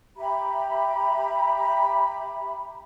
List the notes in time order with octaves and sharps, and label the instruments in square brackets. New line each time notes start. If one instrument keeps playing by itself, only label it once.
[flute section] G4 E5 A#5 B5